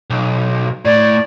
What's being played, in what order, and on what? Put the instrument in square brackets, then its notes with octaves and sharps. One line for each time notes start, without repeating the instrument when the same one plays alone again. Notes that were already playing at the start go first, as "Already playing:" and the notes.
[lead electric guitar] B1
[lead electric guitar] A2 [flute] D5